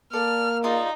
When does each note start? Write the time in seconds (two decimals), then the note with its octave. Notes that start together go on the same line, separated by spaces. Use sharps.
0.13 A#3 A4 D5 A5 F6
0.64 D#4 F4 G#4 D5